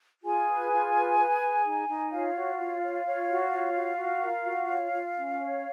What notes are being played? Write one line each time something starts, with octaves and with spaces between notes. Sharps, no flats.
F4 G#4 G#5
B4
F4
B4
B4
G#4
D#4
D#4
F4 C#5 F5
F#4
C#5
C#5
C#5
F#4
C#5
F#4
F#4
A#4
F#4
C#5
F4
C#4
C#5